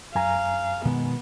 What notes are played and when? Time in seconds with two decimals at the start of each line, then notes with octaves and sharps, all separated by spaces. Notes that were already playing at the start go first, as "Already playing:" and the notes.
0.15 F#2 F5 G#5 A#5
0.85 B2 D#3 G#3 B3